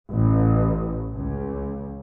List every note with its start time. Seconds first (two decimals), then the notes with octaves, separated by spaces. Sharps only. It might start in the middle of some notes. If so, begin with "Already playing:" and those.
0.11 A1
1.15 C#2